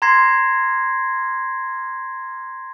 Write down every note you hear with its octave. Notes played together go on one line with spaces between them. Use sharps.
A#5 C6 G#6 A#6 C7